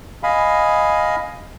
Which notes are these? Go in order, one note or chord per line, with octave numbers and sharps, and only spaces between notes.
D#5 F5 G#5 B5